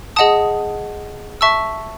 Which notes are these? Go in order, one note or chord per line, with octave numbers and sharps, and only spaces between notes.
G#4 D#5 F#5 A5 D#6
E5 A5 C#6 E6